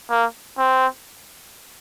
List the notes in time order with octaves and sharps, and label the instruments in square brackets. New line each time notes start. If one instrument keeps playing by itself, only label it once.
[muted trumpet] A#3
C4